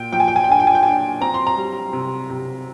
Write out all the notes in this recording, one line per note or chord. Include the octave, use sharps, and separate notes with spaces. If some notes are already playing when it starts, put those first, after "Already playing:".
Already playing: A#2 G5
F3 G5
G#5
G5
G#5
G5
D4 G#5
G5
G#5
G5
D4 G#5
G5
C4 A#5
C6
A#5
G3
C3
C3